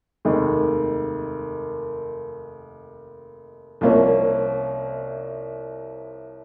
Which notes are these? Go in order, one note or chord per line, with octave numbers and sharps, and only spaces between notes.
F1 D#2 D#3 G#3
C2 C3 F3 A#3 C#4